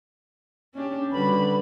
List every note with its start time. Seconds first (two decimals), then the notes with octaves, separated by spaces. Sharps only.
0.74 C#4 D4 G4
1.12 D3 G3 F#4 B4 B5